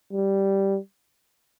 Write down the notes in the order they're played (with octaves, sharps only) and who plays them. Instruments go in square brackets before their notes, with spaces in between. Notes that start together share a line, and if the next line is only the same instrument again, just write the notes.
[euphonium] G3